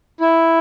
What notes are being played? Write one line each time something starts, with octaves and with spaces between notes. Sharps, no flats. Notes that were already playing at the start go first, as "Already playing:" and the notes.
E4